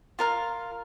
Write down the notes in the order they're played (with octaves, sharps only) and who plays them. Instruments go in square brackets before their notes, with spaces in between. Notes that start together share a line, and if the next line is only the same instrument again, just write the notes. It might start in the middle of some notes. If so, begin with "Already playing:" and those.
[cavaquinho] F4 A#4 F5